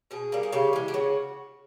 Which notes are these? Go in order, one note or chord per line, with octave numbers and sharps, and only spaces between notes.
B2 G#4
G3 A#3
G#4
C#3 G4
E3 G#3
G4
C#3 F#4